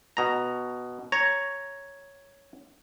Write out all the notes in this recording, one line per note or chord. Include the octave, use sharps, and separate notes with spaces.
B2 A#5
C#5 A#5